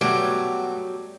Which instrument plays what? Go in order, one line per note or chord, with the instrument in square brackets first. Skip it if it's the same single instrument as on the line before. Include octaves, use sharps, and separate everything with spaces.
[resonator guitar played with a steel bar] F#3 G3 [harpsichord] A3 B3